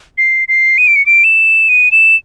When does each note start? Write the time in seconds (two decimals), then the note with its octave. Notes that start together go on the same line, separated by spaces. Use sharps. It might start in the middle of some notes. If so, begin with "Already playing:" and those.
0.18 C7
0.48 C7
0.78 D#7
0.88 D7
0.96 C#7
1.06 D7
1.24 E7
1.69 D#7
1.92 E7